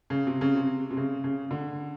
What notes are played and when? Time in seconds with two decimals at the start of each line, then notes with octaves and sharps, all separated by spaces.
0.10 C#3
0.27 C3
0.41 C#3
0.55 C3
0.91 C3
0.97 C#3
1.24 C#3
1.51 D3